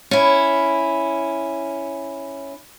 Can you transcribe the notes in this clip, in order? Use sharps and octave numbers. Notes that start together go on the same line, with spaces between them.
C#4 E4